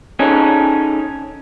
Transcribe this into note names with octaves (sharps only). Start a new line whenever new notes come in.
C#4 D#4 G#4 A4